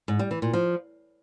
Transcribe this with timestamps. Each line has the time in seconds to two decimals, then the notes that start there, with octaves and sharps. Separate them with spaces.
0.08 G#2
0.19 G3
0.31 E3
0.42 A#2
0.53 F3